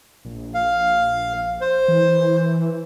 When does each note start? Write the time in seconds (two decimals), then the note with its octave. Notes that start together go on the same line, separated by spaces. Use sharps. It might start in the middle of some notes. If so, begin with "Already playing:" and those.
0.25 A#1
0.54 F5
1.61 C5
1.88 E3